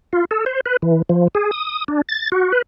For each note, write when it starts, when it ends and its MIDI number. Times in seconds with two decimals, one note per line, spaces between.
0.13 0.25 65
0.31 0.45 69
0.46 0.60 72
0.66 0.77 71
0.82 1.02 52
1.09 1.28 53
1.35 1.51 68
1.51 1.84 87
1.88 2.02 62
2.09 2.30 93
2.32 2.52 66
2.52 2.62 71